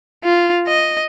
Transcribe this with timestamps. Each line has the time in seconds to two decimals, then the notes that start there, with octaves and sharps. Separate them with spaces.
0.24 F4
0.68 D#5